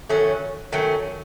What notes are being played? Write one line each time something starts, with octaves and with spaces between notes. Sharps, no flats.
D#3 F#3 A3 C#4
D#3 F#3 A3 C#4